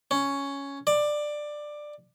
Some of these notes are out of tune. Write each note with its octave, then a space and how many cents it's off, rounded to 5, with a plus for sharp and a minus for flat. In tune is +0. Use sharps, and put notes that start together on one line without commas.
C#4 +5
D5 +15